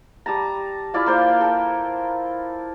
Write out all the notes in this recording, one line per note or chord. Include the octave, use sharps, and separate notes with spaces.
G3 A5 A#5
E4 F4 D5 F5
A#3 A#4 C5
A4 A#4